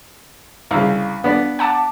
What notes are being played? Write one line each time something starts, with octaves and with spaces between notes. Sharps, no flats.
C2 C#3 F5
B3 D4
F#5 A5 D6